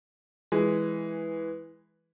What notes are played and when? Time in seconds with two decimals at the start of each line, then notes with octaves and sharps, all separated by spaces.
0.52 E3 G#3